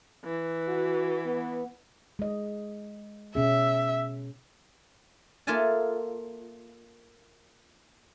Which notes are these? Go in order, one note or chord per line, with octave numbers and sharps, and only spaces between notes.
E3
F#4
B3
G#3 D#5
B2 C#4 G#4 E5
A#3 F4 A4 E5 G#5 A5